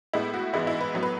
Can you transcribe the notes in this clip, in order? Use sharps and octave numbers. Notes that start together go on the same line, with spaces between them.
A2 G#3 B3 E4
F#4
G#2 E3 G#3 B3 E4
E4
B4
A2 F#3 B3
B4